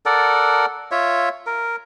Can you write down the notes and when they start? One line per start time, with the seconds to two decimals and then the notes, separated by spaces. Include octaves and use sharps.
0.06 A4 A#4 D5 F#5
0.91 F4 C#5 E5
1.47 A#4